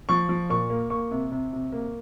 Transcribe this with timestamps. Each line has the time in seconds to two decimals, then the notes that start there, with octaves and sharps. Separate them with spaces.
0.09 F3 C#6
0.29 F3
0.50 A#2 C#6
0.70 A#3
0.90 A#3 C#6
1.11 C3
1.32 C3
1.53 C3
1.72 A#3